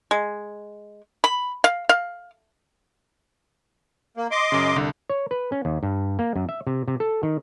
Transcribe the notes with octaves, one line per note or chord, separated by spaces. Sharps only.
G#3
B5
F5
F5
A#3
D#5 C6 D6
F#2 C#3
C2 D3
C#5
B4
C#4
D#2
G2
A#3
F#2
E5
C3
C3
A4
D#3